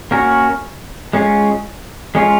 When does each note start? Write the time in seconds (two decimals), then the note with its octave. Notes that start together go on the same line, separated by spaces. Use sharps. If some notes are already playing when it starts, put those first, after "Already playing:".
0.11 A#3 C#4 F#4 A#4 C#5
1.13 G#3 C#4 F4
2.15 G#3 C#4 F4